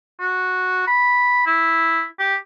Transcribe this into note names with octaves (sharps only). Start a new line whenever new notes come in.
F#4
B5
E4
G4